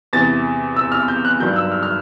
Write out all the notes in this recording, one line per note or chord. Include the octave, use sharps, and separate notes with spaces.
E2 C3 E3 A6
E6
F6
G6
F#6
G2 D#3 F#3 G6
E6
F6
F6